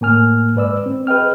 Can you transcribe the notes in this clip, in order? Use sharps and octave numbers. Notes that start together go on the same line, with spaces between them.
A2 A#3 G#5 F6
G#2 B4 D5 E6
C4
G#4 B4 D#5 G5 F6